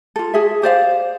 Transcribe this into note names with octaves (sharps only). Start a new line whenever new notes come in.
F4 A4
F#4 G#4 E5
G4 C5 D5 F5